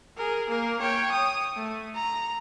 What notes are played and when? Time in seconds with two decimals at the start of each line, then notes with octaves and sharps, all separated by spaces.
0.17 G#4 A#4
0.49 A#3 A#4
0.80 C#5 G5
1.11 D#6
1.57 A3
1.95 A#5